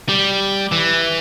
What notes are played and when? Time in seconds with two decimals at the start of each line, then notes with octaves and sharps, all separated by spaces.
0.09 G3
0.72 E3